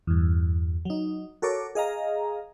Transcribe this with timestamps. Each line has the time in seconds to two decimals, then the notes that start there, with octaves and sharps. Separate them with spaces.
0.07 E2 G2
0.85 F#3 D#4
1.42 F#4 A4 A#4 C#5 D6
1.75 G#4 D#5 F5 A#5